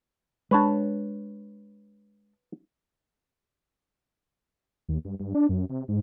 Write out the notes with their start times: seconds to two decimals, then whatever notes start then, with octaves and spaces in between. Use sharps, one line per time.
0.51 G#3 D4 B4 C#5 A5
4.89 D#2
5.05 G2
5.20 G2
5.35 D4
5.49 F#2
5.70 C3
5.88 G#2